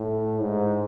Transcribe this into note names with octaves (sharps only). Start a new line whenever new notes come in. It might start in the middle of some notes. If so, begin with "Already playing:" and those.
Already playing: A2
G#2